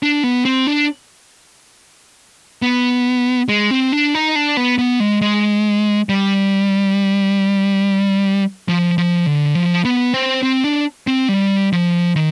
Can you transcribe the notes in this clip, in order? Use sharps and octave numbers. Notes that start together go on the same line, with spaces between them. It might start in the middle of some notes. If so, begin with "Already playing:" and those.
D4
B3
C4
D4
B3
G#3
C4
D4
D#4
D4
B3
B3
G#3
G#3
G3
F3
F3
D3
F3
B3
C4
C4
D4
C4
G3
F3
D#3